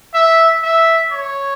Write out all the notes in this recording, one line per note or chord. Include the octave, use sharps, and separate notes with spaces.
E5
E5
C#5